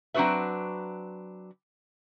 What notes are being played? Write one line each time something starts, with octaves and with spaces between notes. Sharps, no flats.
F#3 C4 D4 F#4 B4 E5